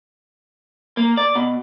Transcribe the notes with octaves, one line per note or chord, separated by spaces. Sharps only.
A#3
D5
B2